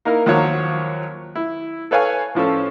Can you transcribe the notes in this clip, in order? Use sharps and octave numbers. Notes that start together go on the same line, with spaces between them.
A#3 D#4 E4 A#4
D#2 F3 F#3 C#5
E4
A4 B4 C#5 F5 G#5
A2 F3 C#4 A4